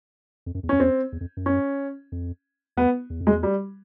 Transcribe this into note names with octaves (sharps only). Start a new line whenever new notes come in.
F2
F#2
E2
F2 C#4
E2 C4
E2
F2
F#2
C#4
F2
E2 B3
E2
F2
G#3
E2
G3